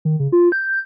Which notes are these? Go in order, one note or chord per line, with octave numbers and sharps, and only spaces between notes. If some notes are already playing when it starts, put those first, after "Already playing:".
D#3
C#3
F4
G6